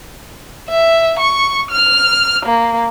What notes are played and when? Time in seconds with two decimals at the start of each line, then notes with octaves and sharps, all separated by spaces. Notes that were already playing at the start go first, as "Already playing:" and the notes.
0.69 E5
1.19 C#6
1.71 F6
2.46 A#3